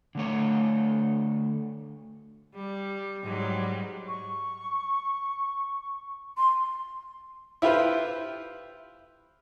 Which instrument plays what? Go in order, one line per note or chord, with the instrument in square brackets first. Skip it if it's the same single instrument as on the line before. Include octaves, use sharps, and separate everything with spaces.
[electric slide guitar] D3 A3 C#5
[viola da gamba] G3
G#2 F#3 G3
[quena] C#6
[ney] C6
[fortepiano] E4 F4 G4 B4 C5